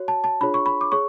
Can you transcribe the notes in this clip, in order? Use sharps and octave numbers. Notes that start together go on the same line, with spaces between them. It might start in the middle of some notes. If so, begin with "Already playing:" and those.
Already playing: F#4 C#5
A5
A5
D4 F4 G#4 C#5 B5
C#6
B5
D6
G#4 C#5 C#6